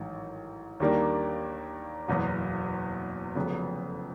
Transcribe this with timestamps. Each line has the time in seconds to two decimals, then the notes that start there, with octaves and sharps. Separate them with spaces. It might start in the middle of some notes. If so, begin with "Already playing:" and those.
Already playing: A1 G#2 D#3 F#3
0.80 D#2 D#3 G3 A#3 D4
2.08 F#1 E2 B2 F#3 B3
3.35 F1 F2 C#3 F#3 B3